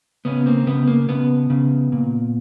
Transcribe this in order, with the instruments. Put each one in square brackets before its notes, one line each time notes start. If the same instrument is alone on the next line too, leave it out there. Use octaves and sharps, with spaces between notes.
[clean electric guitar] C#3 B3 C#4
A#3 C4
C#3 B3
A#3
C#3 B3
C#3
A#2